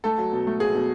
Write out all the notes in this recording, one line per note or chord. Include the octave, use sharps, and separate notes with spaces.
A3 A4
F#3
B2
A3
F#3 G#4
B2